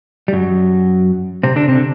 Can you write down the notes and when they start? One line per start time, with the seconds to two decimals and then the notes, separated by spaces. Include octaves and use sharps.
0.28 G3
0.33 F#2 F#3
1.43 C3 C4
1.56 D3 D4
1.68 C3 C4
1.75 D3